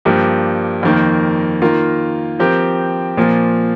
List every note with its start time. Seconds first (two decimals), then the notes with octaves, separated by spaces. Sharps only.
0.05 G2 F3 A#3 G4
0.83 F2 D#3 A#3
1.62 D#3 A#3 F4 A#4
2.39 F3 C4 G4 A#4
3.17 A#2 F3 A#3